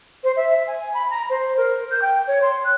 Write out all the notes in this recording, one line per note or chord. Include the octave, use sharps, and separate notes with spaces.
C5
E5
G#5
B5
A#5
C5
A#4
G6
G5
C#5
C6
F#6